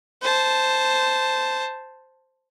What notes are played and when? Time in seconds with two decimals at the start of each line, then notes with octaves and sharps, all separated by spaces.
0.22 C5 A5